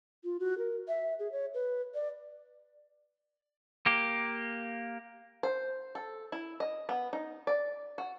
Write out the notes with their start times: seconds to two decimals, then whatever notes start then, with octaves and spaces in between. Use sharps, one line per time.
0.24 F4
0.40 F#4
0.58 A#4
0.88 E5
1.19 G#4
1.32 C#5
1.54 B4
1.94 D5
3.86 A#3 G4
5.43 C5
5.95 A4
6.32 E4
6.60 D#5
6.89 B3
7.13 D#4
7.47 D5
7.98 F#4